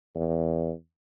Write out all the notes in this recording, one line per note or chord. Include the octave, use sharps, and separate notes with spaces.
E2